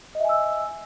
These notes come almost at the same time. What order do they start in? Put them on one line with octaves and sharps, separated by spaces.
D#5 E5 G#5 E6